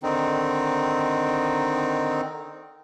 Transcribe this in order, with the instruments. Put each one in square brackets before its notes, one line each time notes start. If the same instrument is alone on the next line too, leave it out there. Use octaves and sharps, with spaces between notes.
[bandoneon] D3 D#3 C4 D#4